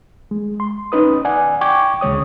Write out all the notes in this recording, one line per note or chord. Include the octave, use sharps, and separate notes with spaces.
G#3
C6
C#4 D#4 B4 D#6
D5 F#5 G#5
G5 C#6 D6 G#6
D2 C#3 G#3 C#5 D#6